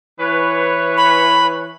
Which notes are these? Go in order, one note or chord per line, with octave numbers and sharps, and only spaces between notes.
E3 B4 C#5
B5